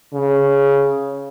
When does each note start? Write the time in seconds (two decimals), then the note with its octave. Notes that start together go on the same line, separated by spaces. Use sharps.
0.14 C#3